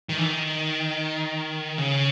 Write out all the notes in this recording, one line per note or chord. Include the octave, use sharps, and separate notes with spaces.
D#3
E3
D#3
C#3